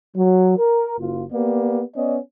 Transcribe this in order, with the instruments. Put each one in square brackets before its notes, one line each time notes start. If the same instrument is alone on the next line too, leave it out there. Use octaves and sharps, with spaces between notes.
[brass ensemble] F#3
A#4
F#1 F4
A#3 B3 G4 D5
B3 C#4 D5 D#5